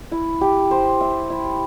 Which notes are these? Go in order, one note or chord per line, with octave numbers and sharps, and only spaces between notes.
E4
G4
C5
E5
E4